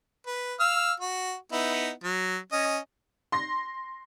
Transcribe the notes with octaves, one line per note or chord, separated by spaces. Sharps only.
B4
F5 E6 F6
F#4
B3 D#4 E4
F#3
C#4 D#5
C6 A#6